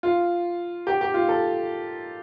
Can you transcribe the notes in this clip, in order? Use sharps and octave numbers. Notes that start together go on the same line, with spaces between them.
F4
G4
G4
F4
A4